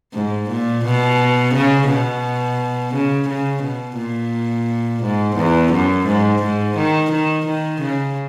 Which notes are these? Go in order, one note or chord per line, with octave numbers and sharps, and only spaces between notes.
G#2
A#2
B2
C#3
B2
C#3
C#3
B2
A#2
G#2
E2
F#2
G#2
G#2
D#3
D#3
D#3
C#3